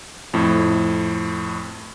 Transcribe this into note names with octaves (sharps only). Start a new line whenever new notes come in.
F2 A2